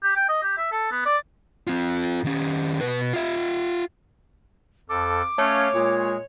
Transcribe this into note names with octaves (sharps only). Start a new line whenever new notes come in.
G4
G5
D#5
G4
E5
A4
B3
D5
C4 F4
D#3 C#4
B2 B4
F4 E5
F2 A4 D6
A3 C#4 C#5 F5
A#2 G#3